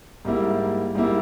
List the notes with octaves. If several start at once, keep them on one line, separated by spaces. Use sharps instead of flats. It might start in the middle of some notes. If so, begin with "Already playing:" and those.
G#2 G3 A#3 E4
G#2 G3 A#3 E4